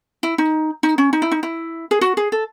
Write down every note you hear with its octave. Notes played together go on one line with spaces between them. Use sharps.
E4
D#4
D#4
C#4
D#4
E4
D#4
E4
G#4
F#4
G#4
A4